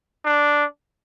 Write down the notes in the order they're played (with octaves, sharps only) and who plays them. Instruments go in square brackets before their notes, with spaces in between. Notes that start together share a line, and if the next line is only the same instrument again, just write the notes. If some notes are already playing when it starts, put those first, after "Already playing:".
[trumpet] D4